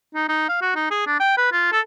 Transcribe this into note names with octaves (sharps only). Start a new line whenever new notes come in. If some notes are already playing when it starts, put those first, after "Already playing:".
D#4
D#4
F5
F#4
D#4
G#4
D4
G5
B4
F4
A4